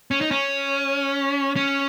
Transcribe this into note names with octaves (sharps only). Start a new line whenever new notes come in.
C#4
D#4
C#4
C#4